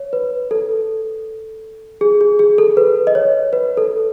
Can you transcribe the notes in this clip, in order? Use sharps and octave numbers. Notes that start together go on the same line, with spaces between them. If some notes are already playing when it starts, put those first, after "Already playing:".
Already playing: C#5
B4
A4
G#4
G#4
G#4
A4
B4
D#5
C#5
B4
A4